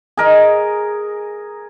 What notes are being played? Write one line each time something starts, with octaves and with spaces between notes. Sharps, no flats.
G#4 A#4 D#5